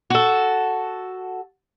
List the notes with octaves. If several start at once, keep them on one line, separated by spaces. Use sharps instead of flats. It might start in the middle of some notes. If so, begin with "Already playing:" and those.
F#4 A4